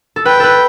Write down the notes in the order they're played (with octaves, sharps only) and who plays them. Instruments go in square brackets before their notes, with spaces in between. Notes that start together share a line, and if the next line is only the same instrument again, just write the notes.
[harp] A4
[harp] B4 [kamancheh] G5
[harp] A4 B4